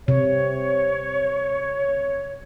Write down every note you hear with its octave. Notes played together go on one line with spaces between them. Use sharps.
C3 C#5